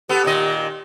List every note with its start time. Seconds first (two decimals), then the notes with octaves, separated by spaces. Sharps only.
0.09 B3 G4 A4
0.24 A#2 D#3 D#5